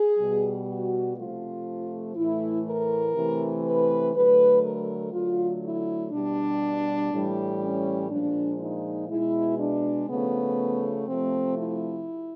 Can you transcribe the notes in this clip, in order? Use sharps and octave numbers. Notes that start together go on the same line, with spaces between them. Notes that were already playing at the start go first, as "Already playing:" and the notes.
Already playing: G#4
B2 G3
F#4
C3 F3 A3 F4
A2 E3 A3 E4
A#4
C3 E3 A3
B4
D3 F#3 A3 B4
A#4
D3 F#3 A3 F4
E4
B2 G3 D4
A2 E3 G3
C#4
A#2 F3 G#3 D4
D#4
B2 G#3 E4
D4
C#3 F3 A3 B3
C3 F3 A3 C4
E4